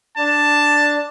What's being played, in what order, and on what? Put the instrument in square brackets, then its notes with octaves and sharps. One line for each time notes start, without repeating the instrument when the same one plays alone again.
[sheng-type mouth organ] D4 [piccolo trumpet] A5